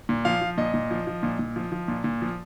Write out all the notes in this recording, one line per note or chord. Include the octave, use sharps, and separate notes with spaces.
A#2
F3 F5
F3
A#2 D#5
A#2
F3
F3
A#2
A#2
F3
F3
A#2
A#2
F3